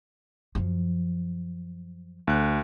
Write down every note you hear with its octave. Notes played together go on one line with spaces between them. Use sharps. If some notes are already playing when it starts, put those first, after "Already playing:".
F#2 F3
D2 F#6